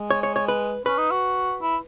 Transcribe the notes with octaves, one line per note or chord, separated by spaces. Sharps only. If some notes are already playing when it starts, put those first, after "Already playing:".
Already playing: G#3
C#5
C#5
C#5
B4
C#4 B4
D#4
F#4
E4